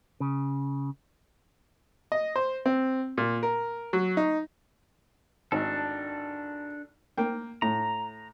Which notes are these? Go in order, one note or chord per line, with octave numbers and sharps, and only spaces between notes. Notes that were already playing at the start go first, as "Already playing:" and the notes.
C#3
D#5
C5
C4
A#2
A#4
F#3
D#4
G#1 D4 A4
A#3 G5
A2 A#5